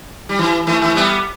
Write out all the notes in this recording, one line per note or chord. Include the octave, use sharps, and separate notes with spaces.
G3
E3
E3 A3
E3 A3
G3 B3